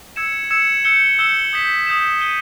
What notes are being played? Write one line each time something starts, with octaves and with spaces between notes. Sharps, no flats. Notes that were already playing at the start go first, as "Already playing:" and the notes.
E6 G#6 C#7 E7
E6 G#6 C#7 E7
E6 G6 C#7 E7 G7
E6 G6 C#7 E7 G7
D#6 G6 B6 E7
D#6 G6 B6 E7
G6 B6 D#7 G7